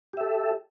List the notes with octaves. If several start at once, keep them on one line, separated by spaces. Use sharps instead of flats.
G4 A4 E5